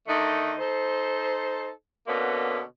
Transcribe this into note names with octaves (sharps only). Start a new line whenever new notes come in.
D3 D#3 A3 D#4
D#4 A4 C5
B2 D3 A#3 B3 C#4